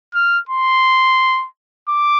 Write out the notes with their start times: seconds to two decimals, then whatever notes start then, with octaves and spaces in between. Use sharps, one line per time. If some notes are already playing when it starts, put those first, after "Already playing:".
0.14 F6
0.49 C6
1.89 D6